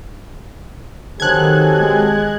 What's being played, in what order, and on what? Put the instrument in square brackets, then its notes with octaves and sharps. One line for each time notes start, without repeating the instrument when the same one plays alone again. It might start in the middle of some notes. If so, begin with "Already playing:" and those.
[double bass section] D#3 [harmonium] F#3 C4 A4 [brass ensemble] G4 G#5 [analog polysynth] F#6 G#6
[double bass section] G#3